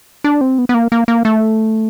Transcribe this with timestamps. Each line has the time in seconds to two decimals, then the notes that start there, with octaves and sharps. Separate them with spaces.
0.24 D4
0.41 C4
0.58 B3
0.69 B3
0.74 A#3
0.92 A#3
1.08 A#3
1.25 A3